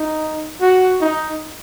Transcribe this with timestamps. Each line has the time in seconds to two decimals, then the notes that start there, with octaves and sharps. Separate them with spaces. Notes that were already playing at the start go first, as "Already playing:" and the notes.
Already playing: D#4
0.61 F#4
1.01 D#4